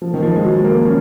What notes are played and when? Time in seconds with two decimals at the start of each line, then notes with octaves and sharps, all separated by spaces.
0.02 F3
0.14 D#3
0.23 F3
0.36 G#3
0.43 F#3
0.64 A#3
0.85 C#4